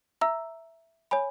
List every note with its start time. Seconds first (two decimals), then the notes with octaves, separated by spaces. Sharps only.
0.21 E5 A#5 E6
1.11 C#5 G#5 B5